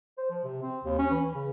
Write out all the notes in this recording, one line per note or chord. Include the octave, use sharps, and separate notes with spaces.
C5
F3
C3
C4
D#2
C#4
E3
C#3